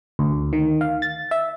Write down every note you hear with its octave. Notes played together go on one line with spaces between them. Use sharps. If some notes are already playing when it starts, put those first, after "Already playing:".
D2
D#3
F5
A6
E5